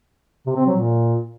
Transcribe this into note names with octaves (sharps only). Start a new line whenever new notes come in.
C3
C4
F#3
A#2